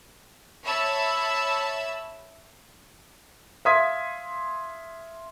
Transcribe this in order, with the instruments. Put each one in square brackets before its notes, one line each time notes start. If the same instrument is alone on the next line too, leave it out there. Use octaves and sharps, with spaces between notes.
[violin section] C#5 E5 A5 B5 E6
[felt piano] E5 F5 C6 D#6 G#6 B6